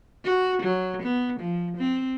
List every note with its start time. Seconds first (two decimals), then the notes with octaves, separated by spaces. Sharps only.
0.24 F#4
0.63 F#3
1.03 B3
1.40 F3
1.77 C4